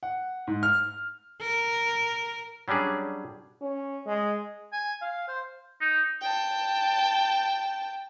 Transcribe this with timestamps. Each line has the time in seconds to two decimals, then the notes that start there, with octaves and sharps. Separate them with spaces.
0.03 F#5
0.47 G#2
0.63 F6
1.41 A#4
2.68 F#3 G3 C#4 D4 G#4
3.62 C#4
4.07 G#3
4.72 G#5
5.02 F5
5.28 C5
5.81 D#4
6.22 G5 A5